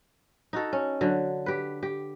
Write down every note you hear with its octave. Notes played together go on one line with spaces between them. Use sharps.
D#4 F#4 A4
C#4
D3 F#3
G4 B4
G4